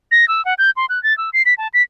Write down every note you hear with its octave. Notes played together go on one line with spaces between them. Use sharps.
A#6
E6
F#5
G6
C6
F#6
A6
E6
C7
B6
A5
B6